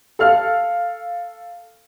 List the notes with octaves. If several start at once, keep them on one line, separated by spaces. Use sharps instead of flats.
A4 F5 F6